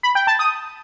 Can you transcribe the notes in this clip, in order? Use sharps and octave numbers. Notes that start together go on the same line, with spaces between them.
B5
G5
A5
D#6